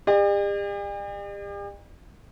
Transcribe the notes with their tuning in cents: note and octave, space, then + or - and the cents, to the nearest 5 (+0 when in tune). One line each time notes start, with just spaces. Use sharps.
G4 +45 D5 +45